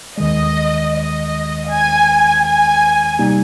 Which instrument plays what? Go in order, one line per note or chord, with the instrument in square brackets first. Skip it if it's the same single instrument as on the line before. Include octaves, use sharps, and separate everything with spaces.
[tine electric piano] D#2 D#3 G#3 [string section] D#5
[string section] D#5
G#5
G#5
[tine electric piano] C3 G3 A#3 D#4 G4